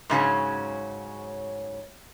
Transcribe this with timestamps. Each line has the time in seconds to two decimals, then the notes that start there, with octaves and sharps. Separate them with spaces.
0.10 G#2 C#3 F#3 C#4